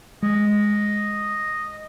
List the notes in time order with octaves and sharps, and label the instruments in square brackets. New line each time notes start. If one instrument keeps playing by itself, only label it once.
[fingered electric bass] G#3 [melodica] D#5